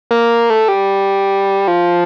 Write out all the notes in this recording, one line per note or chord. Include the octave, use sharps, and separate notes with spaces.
A#3
A3
G3
F3